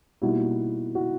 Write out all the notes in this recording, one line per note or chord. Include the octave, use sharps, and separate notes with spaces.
B2 G3 A#3 D#4 E4 F#4
E4 F#4